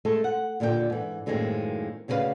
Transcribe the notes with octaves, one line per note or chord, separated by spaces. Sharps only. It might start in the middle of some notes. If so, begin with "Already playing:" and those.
G#3 A3 A4
F#5
D#2 A#2 D3 F#4 G5
G#2 E3
F#2 A2 D#3 G#3 A#3 C4
D2 C#3 E4 G4 B4 F5